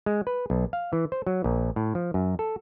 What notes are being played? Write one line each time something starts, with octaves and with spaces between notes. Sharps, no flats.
G#3
B4
B1
F5
E3
C5
F#3
A#1
A2
F3
F#2
A4